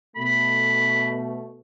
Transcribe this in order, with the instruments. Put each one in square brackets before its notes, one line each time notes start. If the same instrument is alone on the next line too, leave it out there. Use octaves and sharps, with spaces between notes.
[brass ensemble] B2 A3 [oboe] B5